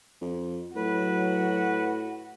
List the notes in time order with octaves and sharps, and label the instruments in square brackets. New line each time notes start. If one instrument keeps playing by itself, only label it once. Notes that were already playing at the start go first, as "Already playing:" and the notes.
[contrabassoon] F2
[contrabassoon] A2 [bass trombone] F#3 [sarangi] F#4 [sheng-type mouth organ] B4